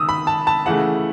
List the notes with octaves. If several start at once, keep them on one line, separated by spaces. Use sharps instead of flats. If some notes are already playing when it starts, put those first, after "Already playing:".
Already playing: D#3 D#6 E6
B5
A5
A5
C#3 E3 A3 F#5